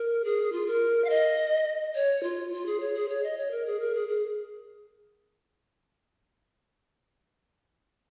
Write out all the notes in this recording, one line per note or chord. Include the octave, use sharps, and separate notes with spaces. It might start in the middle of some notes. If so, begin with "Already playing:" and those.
Already playing: A#4
G#4
F4
A#4
F5
D#5
C#5
F4
F4
G#4
C#5
G#4
C#5
D#5
C#5
A#4
G#4
A#4
G#4
G#4